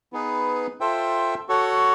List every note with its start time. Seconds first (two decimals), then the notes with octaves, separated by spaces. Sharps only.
0.13 B3 D#4 G#4 B4
0.80 F4 A4 C5 E5 G5
1.48 F#4 A4 C#5 F#5